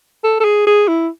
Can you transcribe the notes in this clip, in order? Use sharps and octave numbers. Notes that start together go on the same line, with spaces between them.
A4
A4
G#4
G#4
E4